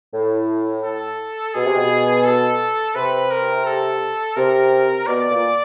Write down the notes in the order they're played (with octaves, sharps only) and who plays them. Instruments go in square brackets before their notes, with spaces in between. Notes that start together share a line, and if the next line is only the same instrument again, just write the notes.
[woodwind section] A2
[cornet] A4
[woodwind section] B2 [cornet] G#4
[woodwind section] C3
B2
[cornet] A4
[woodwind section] C3 [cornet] B4
[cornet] A#4
A4
[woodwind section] C3 [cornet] A#4
[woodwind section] B2 [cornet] D5
[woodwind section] A#2